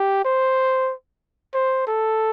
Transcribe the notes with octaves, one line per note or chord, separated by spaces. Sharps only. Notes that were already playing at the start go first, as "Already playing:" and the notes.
Already playing: G4
C5
C5
A4